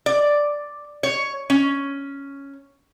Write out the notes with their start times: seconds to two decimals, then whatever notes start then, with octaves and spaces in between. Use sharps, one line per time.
0.06 D5
1.03 C#5
1.50 C#4